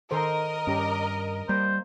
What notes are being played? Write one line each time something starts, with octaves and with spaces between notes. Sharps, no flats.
D#3 A4 A#4 C5 D#5
G2 C#4 G4
G3 A#3 C5